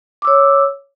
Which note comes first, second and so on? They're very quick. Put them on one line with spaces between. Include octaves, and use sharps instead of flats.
D6 E6 C#5